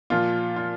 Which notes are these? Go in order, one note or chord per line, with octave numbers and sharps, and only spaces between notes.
A#2 F3 F4
F4